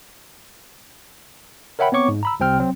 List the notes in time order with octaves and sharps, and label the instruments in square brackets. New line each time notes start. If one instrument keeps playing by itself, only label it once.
[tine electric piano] A#4 C#5 E5 F#5 G5 B5
B3 C4 C#5 C#6 D6
G#2
A#5 B5 E6
C2 C3 C4 G5 F6
F#3 C4